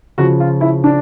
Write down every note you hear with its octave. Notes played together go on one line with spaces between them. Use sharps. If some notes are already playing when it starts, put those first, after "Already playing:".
C#3 F3 F#4
F4
E4
D4